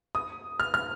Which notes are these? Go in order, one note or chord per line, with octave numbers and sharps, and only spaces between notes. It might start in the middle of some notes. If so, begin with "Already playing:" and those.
D#6
F6
F6